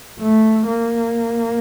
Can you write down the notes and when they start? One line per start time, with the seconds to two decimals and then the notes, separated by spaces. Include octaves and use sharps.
0.20 A3
0.66 A#3